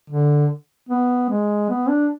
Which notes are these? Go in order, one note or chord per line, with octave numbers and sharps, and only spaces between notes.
D3
B3
G#3
B3
D4